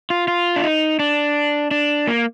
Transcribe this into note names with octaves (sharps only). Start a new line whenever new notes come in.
F4
F4
D4
D#4
D4
D4
A#3